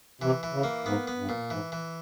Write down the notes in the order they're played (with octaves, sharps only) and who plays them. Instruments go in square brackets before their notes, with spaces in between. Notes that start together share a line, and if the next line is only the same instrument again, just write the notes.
[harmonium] C3 [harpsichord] E3
[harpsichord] E3
[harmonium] C#3
[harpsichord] A#3
[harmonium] G#2 [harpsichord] B3
[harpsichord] B3
[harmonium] G2
[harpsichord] A#2
[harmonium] G#2 [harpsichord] E3
[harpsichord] E3